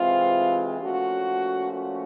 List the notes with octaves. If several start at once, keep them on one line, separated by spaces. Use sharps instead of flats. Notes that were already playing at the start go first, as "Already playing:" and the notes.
Already playing: C3 E3 G#3 C4 F4
A#2 F3 A3 C#4 F#4
F#4